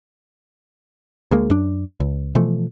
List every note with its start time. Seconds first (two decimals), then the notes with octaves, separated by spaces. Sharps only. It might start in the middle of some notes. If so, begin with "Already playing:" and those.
1.31 D2 G#3 A#3
1.50 F#2 D4
2.00 C#2
2.35 B2 E3 F3 A3